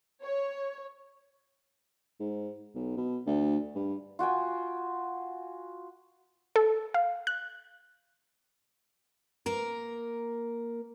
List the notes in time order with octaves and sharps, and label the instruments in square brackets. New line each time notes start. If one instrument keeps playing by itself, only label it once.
[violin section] C#5
[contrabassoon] G#2
B1
B2
D2
G2
[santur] F4 F#4 G5 G#5
[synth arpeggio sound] A4
F5
F#6
[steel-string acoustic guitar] A#3 A#4